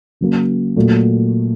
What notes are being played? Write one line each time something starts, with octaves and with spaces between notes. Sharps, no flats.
C#3 F#3 A#3
A#2 F#3 A3